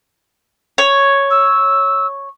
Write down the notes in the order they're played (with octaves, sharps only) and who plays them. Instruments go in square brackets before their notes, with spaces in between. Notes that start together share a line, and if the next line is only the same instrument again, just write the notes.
[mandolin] C#5
[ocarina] E6